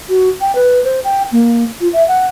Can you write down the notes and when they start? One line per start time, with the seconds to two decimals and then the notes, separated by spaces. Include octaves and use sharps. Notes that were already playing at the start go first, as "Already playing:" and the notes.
0.09 F#4
0.41 G5
0.55 B4
0.84 C5
1.04 G5
1.32 A#3
1.81 F4
1.93 E5
2.08 F#5